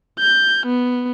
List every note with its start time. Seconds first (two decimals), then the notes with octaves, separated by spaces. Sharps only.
0.19 G6
0.67 B3